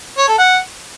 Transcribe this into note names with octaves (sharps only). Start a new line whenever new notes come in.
C#5
A4
F#5